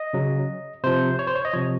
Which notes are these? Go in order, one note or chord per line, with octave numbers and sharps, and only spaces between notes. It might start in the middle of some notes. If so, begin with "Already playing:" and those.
Already playing: D#5
C#3 F#3
C3 F3 C5
C#5
C5
C#5
D#5
C3 F3 C#5